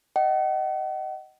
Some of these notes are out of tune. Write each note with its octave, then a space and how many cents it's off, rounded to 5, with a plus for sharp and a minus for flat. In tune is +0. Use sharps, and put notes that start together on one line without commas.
D#5 +0 F#5 +40